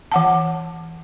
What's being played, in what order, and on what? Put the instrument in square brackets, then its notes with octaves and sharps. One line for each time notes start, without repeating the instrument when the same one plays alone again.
[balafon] E3 F#5 A5